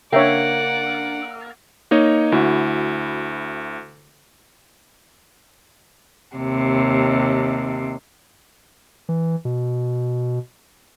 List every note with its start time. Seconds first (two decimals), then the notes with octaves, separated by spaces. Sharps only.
0.13 C#3 A#3 D4 C#5 D5 E5 F#5 G5
1.91 A#3 D#4 C#5 D#5
2.32 D2 E4 F#4
6.35 D#2 C3
9.09 E3
9.45 B2